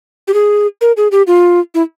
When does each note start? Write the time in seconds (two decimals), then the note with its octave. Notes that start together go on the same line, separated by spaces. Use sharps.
0.28 G4
0.34 G#4
0.81 A#4
0.97 G#4
1.12 G4
1.27 F4
1.75 E4